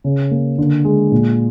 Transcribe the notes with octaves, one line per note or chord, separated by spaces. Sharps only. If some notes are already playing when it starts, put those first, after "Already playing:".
C#3
A#3
D3
G#3
A#2